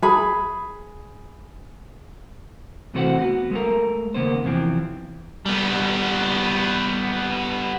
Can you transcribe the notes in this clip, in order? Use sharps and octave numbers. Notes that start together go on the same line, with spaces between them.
G#4 B5
C3 E3 A3 F#4 C5 F#5
B3 F#4
G#3 A3 A#4
D#2 C#3 A#3 B3 C5
E2 C3 E3 F3 C4
G3 B3